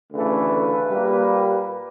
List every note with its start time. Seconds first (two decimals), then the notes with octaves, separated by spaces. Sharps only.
0.10 D2 C#3 E3 A3 B4
0.91 A#2 G3 A#3